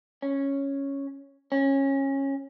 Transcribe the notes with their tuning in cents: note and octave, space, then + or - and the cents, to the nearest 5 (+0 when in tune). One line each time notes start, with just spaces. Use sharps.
C#4 -5
C#4 -20